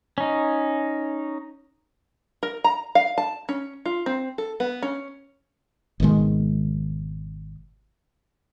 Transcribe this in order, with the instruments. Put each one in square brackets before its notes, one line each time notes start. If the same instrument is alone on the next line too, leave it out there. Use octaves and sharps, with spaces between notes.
[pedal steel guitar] C#4 D#4
[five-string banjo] A#4
A#5
F5
A5
C#4
F4
C4
A4
B3
C#4
[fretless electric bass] G#1 B2 D#3 G#3